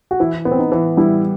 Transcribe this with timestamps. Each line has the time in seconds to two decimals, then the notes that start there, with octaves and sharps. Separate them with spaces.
0.11 F#4
0.20 E3 E4
0.45 B3
0.51 C4
0.59 D#4
0.72 E3
0.97 G3 E4